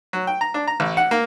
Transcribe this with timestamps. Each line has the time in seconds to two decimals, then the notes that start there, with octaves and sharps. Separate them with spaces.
0.13 F#3
0.27 G5
0.41 A#5
0.54 D4
0.68 A#5
0.80 A1
0.97 F#5
1.11 A#3